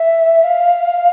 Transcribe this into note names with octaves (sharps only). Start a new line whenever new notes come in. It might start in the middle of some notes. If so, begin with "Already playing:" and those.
Already playing: E5
F5